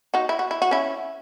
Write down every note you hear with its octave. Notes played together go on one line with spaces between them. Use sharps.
D#4 F#4
E4
F#4
E4
F#4
C#4 E4